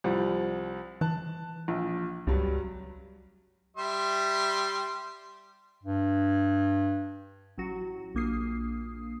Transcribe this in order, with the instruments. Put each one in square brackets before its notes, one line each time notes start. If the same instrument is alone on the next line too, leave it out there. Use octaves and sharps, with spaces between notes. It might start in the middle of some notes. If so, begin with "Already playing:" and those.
[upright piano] C2 F3 G3
[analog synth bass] E3 [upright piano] A5 F#6
[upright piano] A#1
[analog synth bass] C#2 [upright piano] G2 F#3 G3
[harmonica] G3 E5 C6
[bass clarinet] G2
[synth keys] A1 F#3 F#4
A#1 A#3 D#6 C7